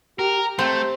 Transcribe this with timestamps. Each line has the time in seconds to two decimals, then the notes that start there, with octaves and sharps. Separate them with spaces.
0.19 G4 A#4
0.59 A3 C4